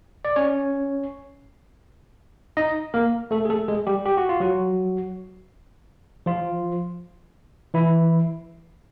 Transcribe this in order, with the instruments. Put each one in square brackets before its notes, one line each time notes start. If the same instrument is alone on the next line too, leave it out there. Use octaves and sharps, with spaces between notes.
[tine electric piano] D5
C#4 C#5
D#4 D#5
A#3 A#4
A3 A4
G#4
A3 A4
G#3 G#4
G3 G4
G4
F#4
F4
F#3 F#4
F3 F4
E3 E4